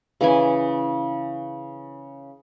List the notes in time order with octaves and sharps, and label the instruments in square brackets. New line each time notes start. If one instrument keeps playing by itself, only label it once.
[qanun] C#3 E3 E4 G#5